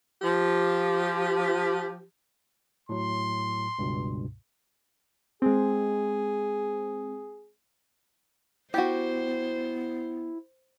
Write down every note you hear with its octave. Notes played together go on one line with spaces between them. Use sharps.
F3 G4
A2 F#3 C6
C#2 G2 B2
G#3 C4 G#4
B3 E4 F#4 G4 C5